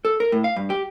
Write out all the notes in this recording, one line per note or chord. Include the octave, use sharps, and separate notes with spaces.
A4
A#4
A2
F5
G2
G4